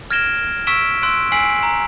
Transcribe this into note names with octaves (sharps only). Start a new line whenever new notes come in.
F6 G#6 A#6 D7 E7 G7
C#6 E6 B6 D7 E7 G7
C6 E6 F#6 D7
G#5 E6 B6 C7 D7 F#7
A#5